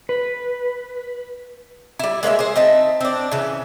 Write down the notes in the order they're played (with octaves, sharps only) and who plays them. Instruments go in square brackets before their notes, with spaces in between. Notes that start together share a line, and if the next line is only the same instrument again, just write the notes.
[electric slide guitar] B4
[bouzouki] G3 E4
G#3 A#3 C#5 E5
G#4 C5
C4 D#4 E5 A5
C4 D4
C#3 E3